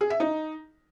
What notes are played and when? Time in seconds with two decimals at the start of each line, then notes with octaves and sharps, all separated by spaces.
0.01 G#4
0.10 E5
0.20 D#4